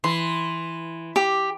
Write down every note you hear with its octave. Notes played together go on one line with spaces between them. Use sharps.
E3 C6
G4